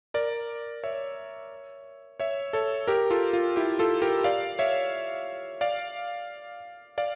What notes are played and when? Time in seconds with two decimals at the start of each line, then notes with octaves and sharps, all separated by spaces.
0.14 A#4 D5
0.84 C#5 E5
2.20 C#5 E5
2.53 A4 C#5
2.88 G4 A#4
3.10 F4 A4
3.33 F4
3.56 E4 G4
3.79 F4 A4
4.02 G4 A#4
4.24 D5 F5
4.59 C#5 E5
5.61 D5 F5
6.98 D5 F5